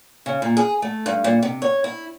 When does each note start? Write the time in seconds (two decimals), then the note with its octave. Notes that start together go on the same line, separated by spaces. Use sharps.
0.26 C#3
0.42 A#2
0.57 G#4
0.82 A3
1.06 G2
1.24 A#2
1.43 C3
1.62 C#5
1.84 E4